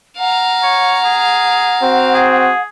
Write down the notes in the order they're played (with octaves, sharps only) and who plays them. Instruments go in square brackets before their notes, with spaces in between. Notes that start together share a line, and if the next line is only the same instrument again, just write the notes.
[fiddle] F5 A#5 [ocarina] F#5
[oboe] C#5
G#4
[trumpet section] C4 F#4
[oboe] G#4